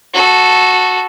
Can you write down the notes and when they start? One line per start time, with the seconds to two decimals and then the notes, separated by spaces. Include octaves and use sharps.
0.14 F#4 A4